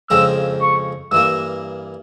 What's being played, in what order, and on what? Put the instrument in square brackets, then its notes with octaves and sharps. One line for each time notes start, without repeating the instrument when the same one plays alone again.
[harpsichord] F2 C#3 F3 G#3 C4 [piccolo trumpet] E6
[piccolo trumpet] C#6
[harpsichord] G2 E3 A#3 [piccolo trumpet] E6